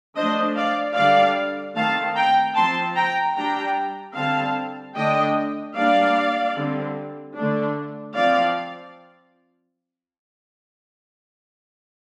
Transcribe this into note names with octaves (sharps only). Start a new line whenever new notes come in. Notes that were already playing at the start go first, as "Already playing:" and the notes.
F3 A3 D4 C5 D#5
D5 F5
D3 G3 D4 D5 F5
D#3 A3 C4 F5 A5
G5 A#5
F3 C4 A5 C6
G5 A#5
G3 D4 G5 A#5
D3 G3 C4 F5 A5
D3 A3 D4 D#5 G5
G3 A#3 D4 D5 F5
D3 G3 C4
D3 A3 D4
F3 C4 D5 F5